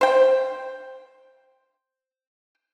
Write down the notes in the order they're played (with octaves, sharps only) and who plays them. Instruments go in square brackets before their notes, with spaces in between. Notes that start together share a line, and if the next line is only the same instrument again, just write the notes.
[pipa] C5 G5